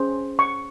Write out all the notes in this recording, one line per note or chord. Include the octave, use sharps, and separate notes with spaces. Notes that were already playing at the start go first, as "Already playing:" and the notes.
Already playing: C#4 G#4 C5
C#6